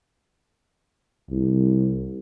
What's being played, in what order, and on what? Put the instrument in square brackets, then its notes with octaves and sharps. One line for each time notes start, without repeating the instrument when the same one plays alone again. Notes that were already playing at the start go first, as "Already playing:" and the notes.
[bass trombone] C2